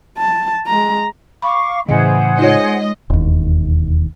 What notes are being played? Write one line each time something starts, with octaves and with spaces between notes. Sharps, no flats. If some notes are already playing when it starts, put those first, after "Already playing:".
A5
G#3 A#5
F5 B5 C#6 D6
A2 C#3 E3 G#4 C5 D#5 F#5
G#3 D#4 F4 C#5 D#5
E1 D#2